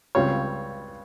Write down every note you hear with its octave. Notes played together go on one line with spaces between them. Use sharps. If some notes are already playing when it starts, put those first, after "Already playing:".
C#2 C#3 G3 C4 F4 C#5